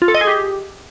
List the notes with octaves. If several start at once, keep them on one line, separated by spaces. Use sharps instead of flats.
F4
A4
D#5
G#4
G4